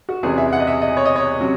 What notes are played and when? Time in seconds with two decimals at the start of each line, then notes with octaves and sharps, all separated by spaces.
0.09 F#4
0.23 E2 C3 E3 G#3 C#4 G#4
0.38 E5
0.53 F#5
0.60 D#5
0.67 E5
0.81 D#5
0.97 C#5
1.05 D#5
1.16 C#5
1.40 C3 F#3 C#4